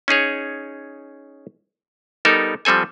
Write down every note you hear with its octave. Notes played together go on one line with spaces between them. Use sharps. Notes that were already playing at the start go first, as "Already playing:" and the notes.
C#4 D#4 G#4 C#5
G3 B3 D#4 A4 A#4
F3 G3 C4 A4 G#5